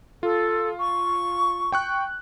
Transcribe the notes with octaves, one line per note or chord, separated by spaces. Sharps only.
F4 A4
C#6
G5 C#6 F#6